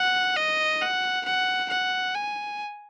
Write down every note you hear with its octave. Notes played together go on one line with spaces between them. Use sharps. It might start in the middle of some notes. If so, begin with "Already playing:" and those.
Already playing: F#5
D#5
F#5
F#5
F#5
G#5